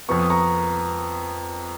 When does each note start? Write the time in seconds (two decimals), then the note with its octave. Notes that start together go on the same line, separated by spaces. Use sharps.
0.08 F2 F3 B3 C#6
0.19 D#6
0.30 A#5 C#6